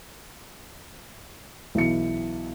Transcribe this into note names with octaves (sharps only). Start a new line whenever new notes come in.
B1 E3 C#7